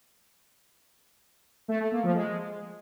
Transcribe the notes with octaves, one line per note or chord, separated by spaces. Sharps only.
A3
A3
A#3
F3
G#3